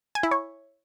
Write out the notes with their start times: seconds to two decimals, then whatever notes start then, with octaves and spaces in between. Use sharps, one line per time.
0.15 G#5
0.23 E4
0.31 C#5